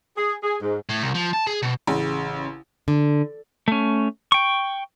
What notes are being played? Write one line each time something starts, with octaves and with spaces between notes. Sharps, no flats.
G#4
G#4
G#2
A2
C2
F3
A5
G#4
B2
A1 C#3
D3
A3 C#4
G5 C#6